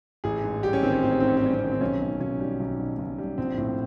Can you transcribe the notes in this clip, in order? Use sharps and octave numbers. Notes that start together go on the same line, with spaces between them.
A1 G#4
G#2
G3 G4
C#4
D#3 C4
C#4
A1 C4
C#4
G#2 C4
C#4
C4
G3 C#4
C4
D#3 C#4
C4
B1 C#4
B2
B1 C#4
G3
B1
B2
B1
G3
A#1 C4
A2